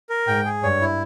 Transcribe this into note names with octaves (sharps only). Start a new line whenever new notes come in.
A#4
G#2 G5
G#4
G2 C#5
E4